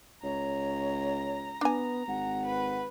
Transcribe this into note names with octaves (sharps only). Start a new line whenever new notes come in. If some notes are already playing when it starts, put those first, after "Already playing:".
C#2 C#5 A#5
B3 D4 G#5
G#1 F#5
B4